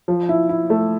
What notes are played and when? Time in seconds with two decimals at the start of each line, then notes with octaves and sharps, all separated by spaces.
0.08 F3
0.29 E4
0.49 E4
0.70 A3